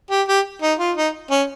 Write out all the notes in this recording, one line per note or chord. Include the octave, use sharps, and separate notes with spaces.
G4
G4
D#4
F4
D#4
C#4